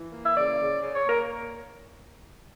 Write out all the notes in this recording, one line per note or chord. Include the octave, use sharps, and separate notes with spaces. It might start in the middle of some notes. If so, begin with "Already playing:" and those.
Already playing: E3
A#3
E5
C#3 D5
C#3
C#3
C#5
A#3 A#4